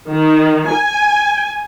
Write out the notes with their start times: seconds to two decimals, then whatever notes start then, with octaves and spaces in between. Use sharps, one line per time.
0.11 D#3
0.72 G#5